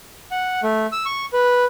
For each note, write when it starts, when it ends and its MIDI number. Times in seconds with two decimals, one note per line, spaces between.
0.31 0.60 78
0.63 0.86 57
0.92 1.05 88
1.06 1.25 85
1.33 1.65 71